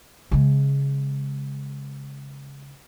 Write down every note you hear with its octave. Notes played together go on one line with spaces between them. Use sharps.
C#3 G#3